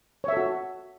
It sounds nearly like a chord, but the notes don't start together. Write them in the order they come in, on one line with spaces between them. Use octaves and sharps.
C#5 E5 A4 F#4